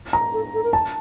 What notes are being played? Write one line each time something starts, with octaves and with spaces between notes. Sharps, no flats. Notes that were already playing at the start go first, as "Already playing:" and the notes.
A#5
A4
A4
A#4
A5